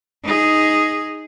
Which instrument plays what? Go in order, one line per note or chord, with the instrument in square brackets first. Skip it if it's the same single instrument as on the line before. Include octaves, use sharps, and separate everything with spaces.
[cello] D#4 G#4